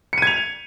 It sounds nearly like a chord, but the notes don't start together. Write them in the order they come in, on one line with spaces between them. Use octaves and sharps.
C#7 D#7 G#6 F7